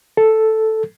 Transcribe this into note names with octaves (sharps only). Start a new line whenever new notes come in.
A4